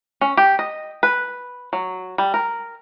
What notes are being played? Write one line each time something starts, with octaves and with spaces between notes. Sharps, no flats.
C#4
G4
D#5
B4
F#3
G3
A#4